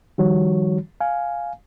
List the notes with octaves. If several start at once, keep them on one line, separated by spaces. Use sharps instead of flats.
D#3 F3 G3 F#4 C#5
F5 G#5